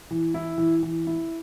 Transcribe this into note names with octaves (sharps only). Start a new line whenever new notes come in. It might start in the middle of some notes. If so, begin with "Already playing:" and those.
E3
E4
E3
E3
E4